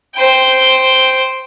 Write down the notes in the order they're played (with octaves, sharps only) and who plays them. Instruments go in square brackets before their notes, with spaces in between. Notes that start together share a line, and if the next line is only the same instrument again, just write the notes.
[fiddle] C5 G5